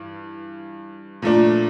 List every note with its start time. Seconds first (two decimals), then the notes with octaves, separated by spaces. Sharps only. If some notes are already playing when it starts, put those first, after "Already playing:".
Already playing: G2 E3
1.22 A#2 F3 A3 D4